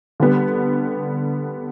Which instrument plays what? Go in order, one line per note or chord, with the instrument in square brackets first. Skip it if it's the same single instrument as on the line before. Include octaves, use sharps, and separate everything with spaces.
[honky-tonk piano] D3 G3 B3